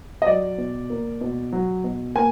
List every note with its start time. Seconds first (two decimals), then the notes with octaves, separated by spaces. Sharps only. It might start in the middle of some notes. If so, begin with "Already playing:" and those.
0.22 D#5
0.27 F#3 D5
0.58 B2
0.90 A#3
1.21 B2
1.52 F#3
1.84 B2
2.15 A#3 G#5